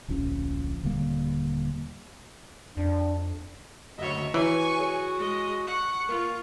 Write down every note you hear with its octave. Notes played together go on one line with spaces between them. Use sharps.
D1 A#1 F3 C#4
D#1 D3 G3 A#3
F2 D4
F#1 D2 C#5 D#5 E5
E3 F#4 B4 C#5 G#5 A#5 C#6
G#4 C#5 C#7
G#3 D#5
F#5 C#6
A#3 F4